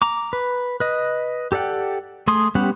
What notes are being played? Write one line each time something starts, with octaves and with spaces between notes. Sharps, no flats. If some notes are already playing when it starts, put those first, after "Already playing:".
A#5 D6
B4
B4 D#5
G4 A4 D5 F#5 G5
A3 G#4 C6 D#6
G3 B3 C#4 G4 F#5